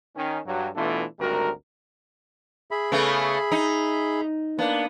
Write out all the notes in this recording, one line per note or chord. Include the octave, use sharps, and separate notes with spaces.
D#3 C#4
G2 F#3
B2 E3 A3 D4 F4 A4
G#1 D2 G3 F#4 A#4
G#4 E5 B5
C#3 A3 B3
D#4
A#3 B3 D4